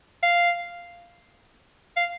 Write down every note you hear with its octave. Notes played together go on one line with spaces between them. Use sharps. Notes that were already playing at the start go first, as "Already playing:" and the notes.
F5
F5